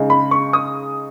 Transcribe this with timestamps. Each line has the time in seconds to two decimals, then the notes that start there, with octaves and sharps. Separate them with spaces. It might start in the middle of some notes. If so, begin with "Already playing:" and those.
Already playing: C#3 G#3 D#4
0.10 B5
0.31 C#6
0.53 D#6